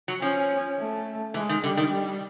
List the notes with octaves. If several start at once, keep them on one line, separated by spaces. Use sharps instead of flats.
F#3
F3 C#4
A3
E3 G#3
D#3
D3 G3
D#3
G3